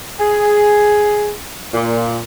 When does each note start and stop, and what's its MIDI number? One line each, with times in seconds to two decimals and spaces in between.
0.20 1.31 68
1.74 2.18 46